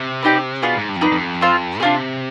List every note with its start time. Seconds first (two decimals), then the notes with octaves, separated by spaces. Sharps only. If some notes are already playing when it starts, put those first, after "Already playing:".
Already playing: C3
0.23 B3 D#4 G4 D5
0.62 B2 B3 D4 F4 G#4
0.75 G#2
0.89 G2
0.96 F2
1.01 D#4 B4 D5
1.12 F2
1.41 C4 F4 C5
1.80 C3 D4 F4 G#4